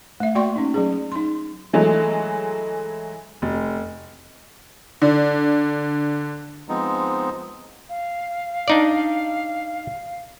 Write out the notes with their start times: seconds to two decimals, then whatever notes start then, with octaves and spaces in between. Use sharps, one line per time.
0.20 A3 E5
0.35 A#3 F#4 D5 G5 C6 C#6
0.56 C#4 D#4
0.74 F#3 C#4 G#4
1.12 D#4 C6
1.73 E3 F#3 G#3 A3
3.42 F1
5.02 D3
6.69 F3 G#3 B3 C4 D#4
7.89 F5
8.68 D4 D#4 D5